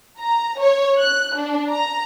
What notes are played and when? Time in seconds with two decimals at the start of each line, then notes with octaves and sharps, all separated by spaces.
0.19 A#5
0.59 C#5
0.99 F#6
1.36 D4
1.69 A#5